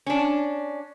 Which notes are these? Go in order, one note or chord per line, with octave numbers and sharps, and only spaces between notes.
C#4 D4